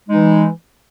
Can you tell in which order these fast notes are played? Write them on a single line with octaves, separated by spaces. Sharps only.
G#3 D#4 E3